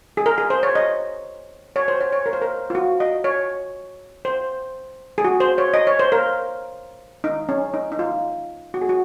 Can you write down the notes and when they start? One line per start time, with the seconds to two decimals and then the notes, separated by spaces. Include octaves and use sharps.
0.17 G#4
0.26 A#4
0.38 G#4
0.50 C5
0.63 C#5
0.75 D#5
1.76 C#5
1.88 C5
2.01 C#5
2.12 C#5
2.26 A#4
2.33 C5
2.42 A#4
2.70 F4
2.75 F#4
3.00 D#5
3.24 C#5
4.25 C5
5.18 G#4
5.25 F#4
5.40 C5
5.58 C#5
5.74 D#5
5.87 C#5
5.99 C5
6.12 A#4
7.24 D#4
7.49 C#4
7.74 D#4
7.92 D#4
7.99 F4
8.74 F#4
8.81 G#4
8.89 F#4